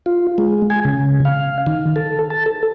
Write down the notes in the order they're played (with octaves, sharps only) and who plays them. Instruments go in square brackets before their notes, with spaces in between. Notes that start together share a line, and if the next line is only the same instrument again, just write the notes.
[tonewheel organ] F4
G#3
G#5
C#3
F5
D#3
A4
A5
A4